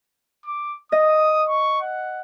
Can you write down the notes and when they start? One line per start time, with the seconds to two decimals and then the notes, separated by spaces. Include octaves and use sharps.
0.46 D6
0.92 D#5 D#6
1.49 C#6
1.81 F#5